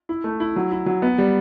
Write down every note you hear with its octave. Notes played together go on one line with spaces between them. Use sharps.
E4
A3
E4
F#3
E4
F#3
B3
G3